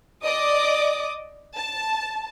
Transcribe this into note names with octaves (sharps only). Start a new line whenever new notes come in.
D5 D#5 D6 D#6
A5